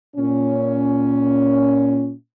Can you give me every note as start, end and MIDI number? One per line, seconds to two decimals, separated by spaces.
0.16 2.12 46
0.16 2.12 61